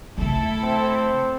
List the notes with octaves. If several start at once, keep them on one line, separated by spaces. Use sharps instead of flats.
C#3 A3 E4 A4
C4